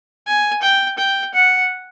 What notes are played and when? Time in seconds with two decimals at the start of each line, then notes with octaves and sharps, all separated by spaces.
0.27 G#5
0.62 G5
0.98 G5
1.35 F#5